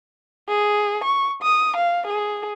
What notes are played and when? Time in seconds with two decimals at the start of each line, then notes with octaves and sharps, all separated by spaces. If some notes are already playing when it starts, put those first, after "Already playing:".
0.48 G#4
1.04 C#6
1.42 D#6
1.76 F5
2.06 G#4